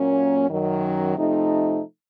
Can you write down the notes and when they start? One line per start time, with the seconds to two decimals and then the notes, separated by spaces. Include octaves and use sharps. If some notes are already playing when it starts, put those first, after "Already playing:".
Already playing: A#2 F#3 A#3 C#4
0.49 F#2 D#3 F#3
1.15 C3 F3 A3 D#4